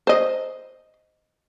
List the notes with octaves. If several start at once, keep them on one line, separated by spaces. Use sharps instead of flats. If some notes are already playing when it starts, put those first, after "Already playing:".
C5 D#5